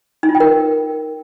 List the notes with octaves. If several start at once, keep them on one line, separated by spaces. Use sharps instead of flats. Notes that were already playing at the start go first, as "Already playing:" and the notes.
D#4
F4
G5
A#4